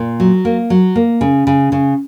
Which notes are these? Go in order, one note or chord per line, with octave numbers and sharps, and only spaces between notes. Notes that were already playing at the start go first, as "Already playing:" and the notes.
Already playing: A#2
F#3
A#3
F#3
A#3
C#3
C#3
C#3